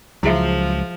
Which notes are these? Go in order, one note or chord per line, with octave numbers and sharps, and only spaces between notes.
C#2 F3 F#3 E4 G#4 E5